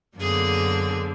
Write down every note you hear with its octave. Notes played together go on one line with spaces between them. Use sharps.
F#2 D3 A#3 B3 G#4